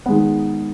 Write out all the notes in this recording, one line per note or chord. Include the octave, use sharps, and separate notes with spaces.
D#3 G#3 B3